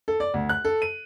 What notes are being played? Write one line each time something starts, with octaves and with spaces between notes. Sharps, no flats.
A4
D5
D2
F#6
A4
D#7